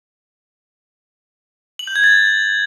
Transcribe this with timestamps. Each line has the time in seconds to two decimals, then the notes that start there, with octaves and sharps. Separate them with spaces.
1.79 F#7
1.87 G6
1.96 G#6
2.04 A6